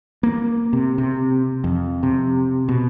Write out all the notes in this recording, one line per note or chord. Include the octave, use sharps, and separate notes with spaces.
A#3
C3
C3
F2
C3
B2